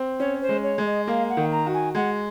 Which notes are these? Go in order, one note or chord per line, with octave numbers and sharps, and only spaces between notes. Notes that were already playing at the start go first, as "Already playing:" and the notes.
Already playing: C4
C#4 C#5
C5
G#3
C#5
G#3
D#5
A#3 F5
F#5
D#3
A#5
F#4
G#5
G#3 F#5